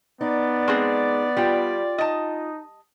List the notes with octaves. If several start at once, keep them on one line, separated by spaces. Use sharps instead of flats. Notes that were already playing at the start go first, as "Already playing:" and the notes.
B3 D#4 D5
G#3 C4 G#4
G3 F4 G5
D#4 D#5 A5